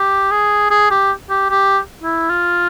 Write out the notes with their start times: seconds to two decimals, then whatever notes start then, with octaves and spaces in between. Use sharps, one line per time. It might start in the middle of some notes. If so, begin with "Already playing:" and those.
Already playing: G4
0.31 G#4
0.71 G#4
0.90 G4
1.30 G4
1.50 G4
2.03 E4
2.30 F4